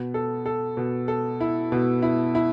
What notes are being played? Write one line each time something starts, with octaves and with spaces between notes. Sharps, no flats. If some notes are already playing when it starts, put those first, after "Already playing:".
Already playing: B2
A4
A4
B2
A4
E4
B2
E4
E4